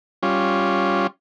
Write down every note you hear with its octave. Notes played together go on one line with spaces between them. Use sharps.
G3 C#4 F4